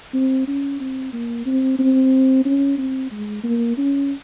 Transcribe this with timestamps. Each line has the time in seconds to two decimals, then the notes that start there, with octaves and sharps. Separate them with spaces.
0.14 C4
0.47 C#4
0.80 C4
1.13 A#3
1.46 C4
1.79 C4
2.45 C#4
2.78 C4
3.11 G#3
3.44 A#3
3.77 C#4